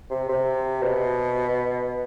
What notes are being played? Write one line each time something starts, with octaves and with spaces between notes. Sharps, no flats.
C3
C3
B2